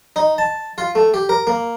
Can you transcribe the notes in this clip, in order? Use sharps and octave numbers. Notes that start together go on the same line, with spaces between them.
D#4
A5
F4
A3
G4
A#4
A#3